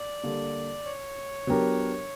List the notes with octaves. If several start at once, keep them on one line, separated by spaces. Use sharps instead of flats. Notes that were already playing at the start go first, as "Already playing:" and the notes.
Already playing: D5
D3 G3 A#3
C#5
F#3 B3 D4 G4 A#4